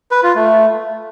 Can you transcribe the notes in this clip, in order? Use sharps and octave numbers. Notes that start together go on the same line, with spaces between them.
B4
F4
A3